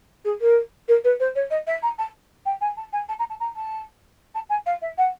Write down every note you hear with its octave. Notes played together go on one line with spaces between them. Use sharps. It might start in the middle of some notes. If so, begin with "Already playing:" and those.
G#4
A#4
A#4
B4
C5
C#5
D#5
E5
A#5
A5
G5
G#5
A5
G#5
A5
A#5
A5
A#5
A5
A5
G#5
F5
E5
F#5